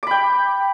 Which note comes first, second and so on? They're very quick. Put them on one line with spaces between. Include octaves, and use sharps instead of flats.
D6 B5 G5